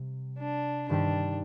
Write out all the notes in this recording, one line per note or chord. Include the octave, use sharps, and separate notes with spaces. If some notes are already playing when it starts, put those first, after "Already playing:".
Already playing: C3 G3
D4
G2 D#3 G3 C4 D4 G4